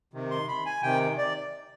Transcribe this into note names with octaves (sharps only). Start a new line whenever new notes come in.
C3 D#3
C6
B5
G#5
C3 D#3 G5
D5